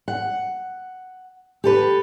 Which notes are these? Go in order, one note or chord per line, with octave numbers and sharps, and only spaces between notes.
F#5
G4 A4 B4